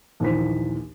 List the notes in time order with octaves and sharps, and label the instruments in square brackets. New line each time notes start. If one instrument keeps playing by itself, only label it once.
[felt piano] A#1 D#2 E3 D#4 C5 B6